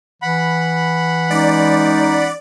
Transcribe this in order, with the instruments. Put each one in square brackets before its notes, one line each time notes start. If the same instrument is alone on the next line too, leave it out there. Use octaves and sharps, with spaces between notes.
[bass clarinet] E3 [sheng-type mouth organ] F#5 B5
[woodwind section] G#3 C#4 D#4 [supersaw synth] D5